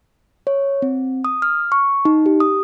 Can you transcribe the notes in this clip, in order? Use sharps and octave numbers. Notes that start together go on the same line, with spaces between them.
C#5
C4
D#6
F6
C#6
D#4
G4
D#6